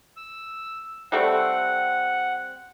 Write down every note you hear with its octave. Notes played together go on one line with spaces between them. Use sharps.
E6
G3 A3 C4 F#5